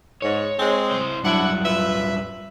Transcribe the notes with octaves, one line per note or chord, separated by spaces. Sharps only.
G#2 C#5
G#3 C4
E4 C5
G2 F#3 D4 E4 F#5
F4 B4 E5